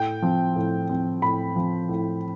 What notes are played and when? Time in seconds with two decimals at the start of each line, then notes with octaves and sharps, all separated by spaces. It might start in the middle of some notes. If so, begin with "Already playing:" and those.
Already playing: A2 G5
0.22 F3 C4
0.56 A2
0.89 F3 C4
1.22 A2 B5
1.56 F3 C4
1.89 A2